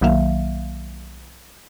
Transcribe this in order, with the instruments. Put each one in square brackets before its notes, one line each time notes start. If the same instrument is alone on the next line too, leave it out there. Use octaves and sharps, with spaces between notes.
[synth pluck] B1 D#3 F#3 A#3 E5 F5